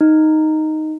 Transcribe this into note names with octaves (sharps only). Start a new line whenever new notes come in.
D#4